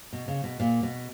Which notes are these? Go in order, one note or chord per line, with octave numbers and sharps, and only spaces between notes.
B2
C#3
B2
A#2
B2